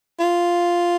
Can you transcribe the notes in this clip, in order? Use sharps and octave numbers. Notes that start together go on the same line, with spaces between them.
F4